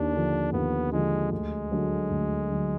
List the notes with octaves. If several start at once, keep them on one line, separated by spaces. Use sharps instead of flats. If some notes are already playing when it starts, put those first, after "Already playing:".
Already playing: D#2 D4
D3 F3
D#2 B3
D3 F3 G#3
D2 G#3
D3 F#3
D2
D3 F#3